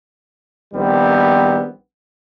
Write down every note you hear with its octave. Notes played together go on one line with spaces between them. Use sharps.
A#1 D#3 G3 B3 C4